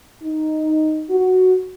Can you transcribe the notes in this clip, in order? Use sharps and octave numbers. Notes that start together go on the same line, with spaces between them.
D#4
F#4